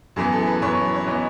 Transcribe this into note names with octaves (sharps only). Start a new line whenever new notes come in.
F#2 E3 B3 G#4
A4
B4
F#2 E3 B3 C#5
C#5
E3 B3 D#5